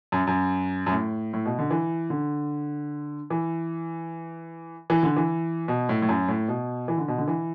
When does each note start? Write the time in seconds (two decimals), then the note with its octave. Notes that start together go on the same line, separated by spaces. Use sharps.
0.12 F#2
0.27 F#2
0.86 F#2
0.91 A2
1.33 A2
1.46 B2
1.59 D3
1.70 E3
2.10 D3
3.30 E3
4.90 E3
5.03 D3
5.16 E3
5.68 B2
5.89 A2
6.02 A2
6.09 F#2
6.28 A2
6.48 B2
6.88 E3
6.98 D3
7.08 B2
7.18 D3
7.28 E3